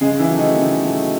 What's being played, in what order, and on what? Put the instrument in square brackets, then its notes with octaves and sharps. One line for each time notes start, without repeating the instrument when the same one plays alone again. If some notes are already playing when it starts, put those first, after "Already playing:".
[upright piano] C#3 [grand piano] G#3 G#4
[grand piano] E3 E4
[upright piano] F#3 A3
[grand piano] D#3 D#4
[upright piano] C#3
F#3 A3